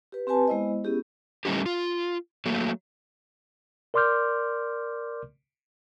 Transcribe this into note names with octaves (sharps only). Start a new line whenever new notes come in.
G4 B4
C4 G4 B4 G#5 A5
G#3 B3 E4 C5 D#5
B3 C#4 E4 G4 G#4
G3 A3 C#4 D#4 E4 G4
F4
F#3 A3 A#3
A#4 D5 C6 D6 F6 G6